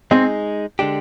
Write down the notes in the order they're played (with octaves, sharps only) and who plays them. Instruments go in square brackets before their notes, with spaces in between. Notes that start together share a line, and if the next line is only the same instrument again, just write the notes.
[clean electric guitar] G#3 D#4 G#4 [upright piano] C4
[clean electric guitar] D3 G#3 D4 G4